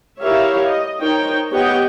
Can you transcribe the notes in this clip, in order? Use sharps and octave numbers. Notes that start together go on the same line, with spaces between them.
E4 G4 A#4 C#5 E5 F5
D#5
D#4 A#4 C5 C#5 G5
B3 G4 C#5 D#5 F#5 G5